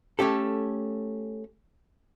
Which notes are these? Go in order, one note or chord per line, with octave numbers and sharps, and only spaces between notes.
A3 C#4 G4 A4